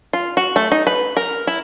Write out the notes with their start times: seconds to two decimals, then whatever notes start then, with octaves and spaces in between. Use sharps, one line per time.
0.13 F4
0.37 F#4
0.56 A3
0.72 D#4
0.87 B4
1.17 A#4
1.47 E4